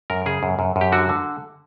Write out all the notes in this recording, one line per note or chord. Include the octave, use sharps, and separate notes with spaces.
F#2 A#4
C#3 G#4
F#2
F#2
F#2
G4
D3 F#4
D3